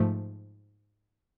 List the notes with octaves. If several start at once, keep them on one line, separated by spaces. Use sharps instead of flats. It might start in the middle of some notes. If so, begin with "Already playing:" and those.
Already playing: G#2 F3 A3